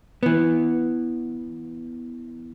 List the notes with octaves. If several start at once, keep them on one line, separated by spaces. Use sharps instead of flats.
E3 B3